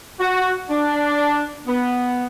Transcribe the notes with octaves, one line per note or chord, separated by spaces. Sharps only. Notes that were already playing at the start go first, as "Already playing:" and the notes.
F#4
D4
B3